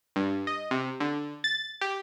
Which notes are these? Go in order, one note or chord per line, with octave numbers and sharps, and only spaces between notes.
G2
D#5
C3
D3
A6
G4